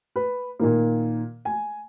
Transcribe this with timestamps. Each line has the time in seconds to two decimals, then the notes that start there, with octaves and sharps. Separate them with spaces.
0.16 B4
0.59 A#2 D#3 A#3
1.45 G#5